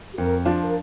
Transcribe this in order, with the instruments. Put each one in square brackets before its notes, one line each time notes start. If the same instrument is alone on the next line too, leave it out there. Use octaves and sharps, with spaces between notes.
[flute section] G4
[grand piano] F2 [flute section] A#4
[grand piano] F3 D4 F4 D5
[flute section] A#4